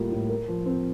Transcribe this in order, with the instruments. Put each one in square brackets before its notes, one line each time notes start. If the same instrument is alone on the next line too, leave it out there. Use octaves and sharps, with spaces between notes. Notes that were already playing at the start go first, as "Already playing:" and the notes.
Already playing: [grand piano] A2 G3 A#3 F4
A2
A#4
F3
C4